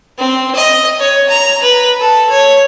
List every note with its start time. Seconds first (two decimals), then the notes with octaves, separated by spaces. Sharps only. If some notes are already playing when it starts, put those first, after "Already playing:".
0.19 C4
0.55 D#5
1.00 C#5
1.29 A#5
1.63 B4
2.00 A4
2.30 C#5